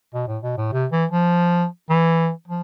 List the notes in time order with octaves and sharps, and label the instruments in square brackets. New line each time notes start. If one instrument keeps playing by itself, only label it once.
[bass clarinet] B2
A2
B2
A2
C3
E3
F3
E3
F3